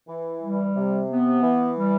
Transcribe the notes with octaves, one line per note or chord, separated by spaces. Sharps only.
E3
G3
C3
B3
E3
G3